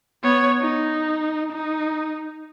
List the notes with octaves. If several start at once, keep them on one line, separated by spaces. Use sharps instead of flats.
B3 C#5
D#4
D#4